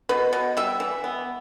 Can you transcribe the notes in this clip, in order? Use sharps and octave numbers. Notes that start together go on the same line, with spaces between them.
B2 B4
B2
G3 E5
E3
B3